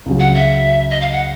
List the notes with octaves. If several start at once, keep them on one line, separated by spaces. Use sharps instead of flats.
C#2 C#3 F#3
F#5
E5
D#5
F5
F#5